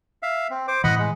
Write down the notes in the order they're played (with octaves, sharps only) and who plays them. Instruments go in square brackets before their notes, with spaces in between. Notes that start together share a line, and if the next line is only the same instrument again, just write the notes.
[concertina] E5 F5
C4
C5 D6
[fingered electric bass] A2 E3 [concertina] D#5 F#5 B5
[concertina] G#3